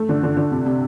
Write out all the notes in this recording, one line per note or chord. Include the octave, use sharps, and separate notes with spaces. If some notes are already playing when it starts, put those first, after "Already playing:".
Already playing: A3
D3
D3
D3
C3
C3